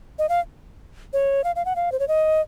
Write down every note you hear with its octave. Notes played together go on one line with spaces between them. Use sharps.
D#5
F5
C#5
F5
F5
F#5
F5
C5
C#5
D#5